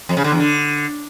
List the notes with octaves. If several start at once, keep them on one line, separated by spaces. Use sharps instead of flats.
F2
C#3
D3
E2
D3